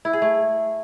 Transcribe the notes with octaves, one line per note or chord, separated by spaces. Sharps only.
E4
G#4
A3